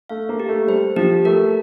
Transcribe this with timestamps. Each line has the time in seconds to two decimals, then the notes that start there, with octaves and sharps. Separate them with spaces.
0.09 A3 F5
0.29 A#3
0.39 G4
0.49 A3
0.68 G3 C5
0.96 F3 G4
1.25 A3 A#4